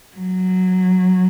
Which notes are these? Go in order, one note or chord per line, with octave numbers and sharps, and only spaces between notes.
F#3